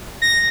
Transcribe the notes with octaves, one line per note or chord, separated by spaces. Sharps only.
A#6